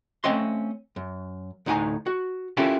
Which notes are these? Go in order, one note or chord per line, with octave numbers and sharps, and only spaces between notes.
A3 C4 C#4 D#5 C6
F#2
D2 A2 D#4 F#5 G#5 A#5
F#4
C#4 E4 F4 G4 A4 A#4